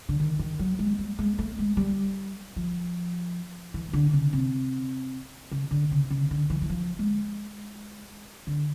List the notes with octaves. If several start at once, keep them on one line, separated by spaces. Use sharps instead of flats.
D3
D#3
D#3
F#3
G#3
G3
G#3
A3
G#3
G3
F3
E3
D3
C#3
C3
C#3
D3
C#3
C#3
D3
E3
E3
F3
G#3
D3